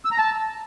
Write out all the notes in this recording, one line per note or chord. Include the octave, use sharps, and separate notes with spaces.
E6
A#5
A5